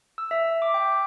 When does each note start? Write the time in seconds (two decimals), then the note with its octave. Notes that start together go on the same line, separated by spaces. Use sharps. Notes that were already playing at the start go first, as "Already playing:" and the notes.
0.18 E6
0.31 E5
0.62 D6
0.74 G5